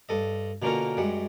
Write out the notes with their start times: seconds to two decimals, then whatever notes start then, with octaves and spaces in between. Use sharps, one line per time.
0.09 G2 A4 D#5
0.62 B2 D3 A#3 C#4 F4 A#4
0.97 F#2 G3 G#3 F#5